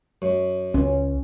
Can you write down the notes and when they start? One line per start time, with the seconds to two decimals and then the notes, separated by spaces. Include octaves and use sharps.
0.22 F#2
0.74 C#2 C#4